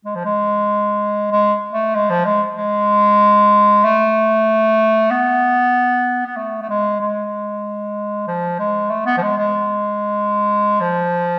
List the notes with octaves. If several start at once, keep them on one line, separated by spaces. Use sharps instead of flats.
G#3
F3
G#3
G#3
A3
G#3
F3
G#3
G#3
A3
B3
B3
A3
A3
G#3
G#3
F3
G#3
A3
B3
F3
G#3
G#3
F3